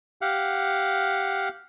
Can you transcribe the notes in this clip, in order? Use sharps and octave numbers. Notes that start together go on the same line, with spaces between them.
G4 F5 F#5